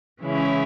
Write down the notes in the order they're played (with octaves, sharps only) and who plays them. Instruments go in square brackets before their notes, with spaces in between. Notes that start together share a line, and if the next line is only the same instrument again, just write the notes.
[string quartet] C#3 E3 G#3 C#4 E4